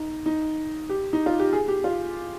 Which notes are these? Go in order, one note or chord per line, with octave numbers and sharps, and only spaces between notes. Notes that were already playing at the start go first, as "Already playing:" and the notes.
Already playing: D#4
D#4
G4
D#4
F4
G4
G#4
G4
F4